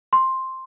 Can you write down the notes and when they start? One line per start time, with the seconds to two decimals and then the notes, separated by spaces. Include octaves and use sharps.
0.13 C6